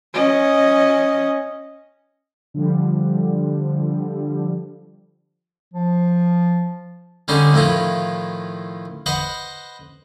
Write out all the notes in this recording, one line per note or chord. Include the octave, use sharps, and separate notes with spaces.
C#4 D#5
D3 F3 G3
F3
D3 G3 C#4 D#4 G#4 C5
A2 D#3 F3 E4 F4
B4 C5 D#5 F#5 B5